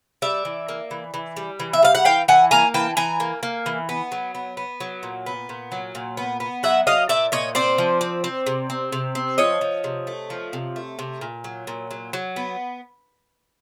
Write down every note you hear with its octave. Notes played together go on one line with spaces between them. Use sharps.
G3 D5 E5
E3
A#3
E3
E3
G3
E3
E5
G3 F5
F#5
E3 F5 G5
E3 F#5 G#5
A#3 G#5 A#5
E3 G5 A5
E3 G#5 A#5
A#3
A#3
E3
B3
F#3
B3
B3
F#3
A#2
B3
A#2
F#3
A#2
B3
B3
F#3 E5 F#5
F#3 D#5 F5
A#2 D5 E5
A#2 C#5 D#5
C4 C5 D5
F3
C4
C4
C3
C4
C3
C4
F3 C#5 D#5
F3
C3
A3
F3
C3
A3
C3
A#2
F#3
A#2
F#3
F#3
B3